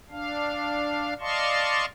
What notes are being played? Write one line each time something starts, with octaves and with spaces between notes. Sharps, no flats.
D4 F5
D5 D#5 F5 A5 C6 C#6